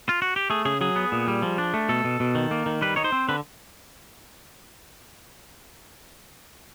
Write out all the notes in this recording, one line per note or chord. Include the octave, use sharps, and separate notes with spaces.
F4
F#4
G4
A3 G#4
C#3 G#4
F#3 G#4
B3
A#2
G3
F3
D4
A3
B2 A4
B2
B2
D#3
A#3
D#3
G3 B4
D#4 C#5
C5
C4
D3 B4